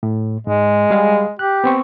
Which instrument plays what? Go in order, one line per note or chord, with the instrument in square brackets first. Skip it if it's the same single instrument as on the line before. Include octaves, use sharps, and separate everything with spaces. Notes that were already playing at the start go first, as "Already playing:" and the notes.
[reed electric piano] A2
[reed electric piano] G#2 [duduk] G#3
[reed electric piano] G3 G#4 F5
[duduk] G4 [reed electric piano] F#6
[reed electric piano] B3 C4 C#6